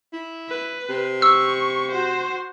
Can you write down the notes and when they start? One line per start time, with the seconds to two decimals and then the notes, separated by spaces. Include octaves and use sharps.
0.13 E4
0.49 B4
0.89 C3
1.22 C#6 E6
1.92 F#4 C5